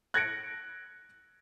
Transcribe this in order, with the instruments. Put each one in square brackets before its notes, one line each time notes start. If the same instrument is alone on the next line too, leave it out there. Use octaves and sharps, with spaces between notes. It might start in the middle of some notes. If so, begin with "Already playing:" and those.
[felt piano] F#6 G#6 A#6 C#7 D7